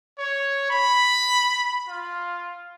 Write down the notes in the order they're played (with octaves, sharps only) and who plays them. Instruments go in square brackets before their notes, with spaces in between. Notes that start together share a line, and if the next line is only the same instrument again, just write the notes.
[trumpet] C#5
B5
F4